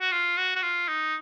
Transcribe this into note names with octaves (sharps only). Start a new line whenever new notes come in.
F#4
F4
F#4
F#4
F4
D#4